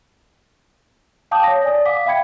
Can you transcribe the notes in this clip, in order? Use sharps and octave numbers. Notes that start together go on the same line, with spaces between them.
F5 G5 A5 D6 D#6 G6
C#5 A#6
D5 G#5 D#6
F5 F#5 D6 B6
E5 F5 G5 B5 G#6 C#7